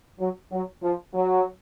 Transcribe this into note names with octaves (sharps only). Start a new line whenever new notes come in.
F#3
F#3
F3
F#3